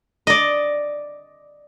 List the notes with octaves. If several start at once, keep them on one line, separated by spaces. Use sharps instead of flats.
D5 D#5